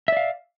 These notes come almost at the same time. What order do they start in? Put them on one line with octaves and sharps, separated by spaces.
E5 D5 F5